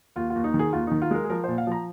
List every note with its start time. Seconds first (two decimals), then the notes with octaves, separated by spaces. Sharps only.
0.16 D#2 F4
0.30 F4
0.36 D#2
0.44 D#4
0.54 D#3
0.59 G#4
0.73 D#2 F4
0.87 D#3 D#4
1.02 F4
1.11 G#3 A#4
1.24 G#4
1.29 F3 A#4
1.44 A#2 C5
1.58 F5
1.67 F3 A#5